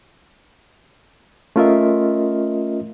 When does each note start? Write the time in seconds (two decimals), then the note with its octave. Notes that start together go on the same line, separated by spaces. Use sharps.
1.56 A3 C#4 F4 A#4 D#5 E5